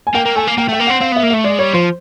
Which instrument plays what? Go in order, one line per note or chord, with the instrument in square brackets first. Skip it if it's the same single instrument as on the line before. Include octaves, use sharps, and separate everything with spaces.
[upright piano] G#5
[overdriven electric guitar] A#3 [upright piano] G5
[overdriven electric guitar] A#3
[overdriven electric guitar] A3 [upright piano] G#5
[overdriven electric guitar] A#3
[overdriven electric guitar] A#3 [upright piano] G5
[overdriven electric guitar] A3 [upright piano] G5
[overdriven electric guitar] A#3
[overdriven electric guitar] C4 [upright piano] F#5
[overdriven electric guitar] C4 [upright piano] F5
[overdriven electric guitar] B3 [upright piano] E5
[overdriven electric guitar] A#3
[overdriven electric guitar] A3 [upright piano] E5
[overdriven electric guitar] G#3 [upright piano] D5
[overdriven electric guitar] G3 [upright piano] C#5
[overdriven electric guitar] F3 [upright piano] C5